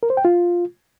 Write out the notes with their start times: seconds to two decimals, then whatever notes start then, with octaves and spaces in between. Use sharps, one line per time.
0.03 A#4
0.10 C5
0.17 G5
0.25 F4